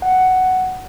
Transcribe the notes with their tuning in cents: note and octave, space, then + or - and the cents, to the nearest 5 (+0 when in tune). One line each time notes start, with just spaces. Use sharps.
F#5 +10